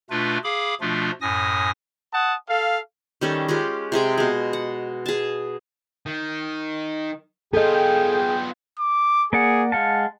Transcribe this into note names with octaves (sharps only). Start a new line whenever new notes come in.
B2 A3 D4 F4 B4
G#4 F5 B5 D6
B2 F3 A3 D4 F4
F#2 A2 G#5 D#6 A#6
F#5 A5 D#6
A4 F5
D#3 G3 C#4 A4
G#3 C#4 F4 G4
C3 G#3 G#4 G5
B2 G#3
F#5
G#4 A5
D#3
B3 F4 G#4 A4 D#5 G5
D6
A#3 G#4 D5 F#5
G#3 F5 F#5 A5